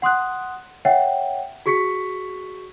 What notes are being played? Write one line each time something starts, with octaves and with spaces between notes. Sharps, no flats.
F#5 C6 D#6 F#6
C#5 E5 F#5 G5
F#4 G#4 C#6 B6 C#7